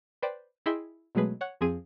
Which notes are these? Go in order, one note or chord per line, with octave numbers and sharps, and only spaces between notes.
B4 C5 D5 G5
E4 G#4 D#5 E5 G5 C6
B2 F#3 G#3 A3 G#4 B4
C#5 F#5 F#6
F2 F3 C4 G#4 D#7